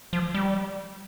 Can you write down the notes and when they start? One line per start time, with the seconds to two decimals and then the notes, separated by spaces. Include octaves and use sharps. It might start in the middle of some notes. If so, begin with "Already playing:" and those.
0.13 F3
0.34 G3